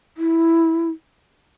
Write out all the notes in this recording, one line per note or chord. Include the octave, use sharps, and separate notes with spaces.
E4